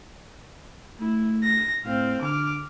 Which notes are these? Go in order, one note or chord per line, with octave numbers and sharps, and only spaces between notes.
A3 E4
A#6
A2 C4 F5
D3 D6 F6